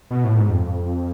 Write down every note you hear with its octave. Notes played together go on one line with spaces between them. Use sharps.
B2
A2
G#2
F2